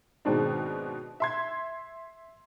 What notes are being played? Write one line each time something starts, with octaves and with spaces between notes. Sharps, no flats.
G#2 B2 D#3 G#3 C4 D4
E5 C6 G#6